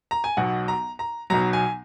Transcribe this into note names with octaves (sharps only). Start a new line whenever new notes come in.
A#5
G#5
B1 B2 F#3 F#5
A#5
A#5
B1 B2 F#3 A#5
G#5